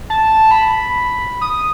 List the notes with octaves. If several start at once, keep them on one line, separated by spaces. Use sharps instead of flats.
A5
B5
D#6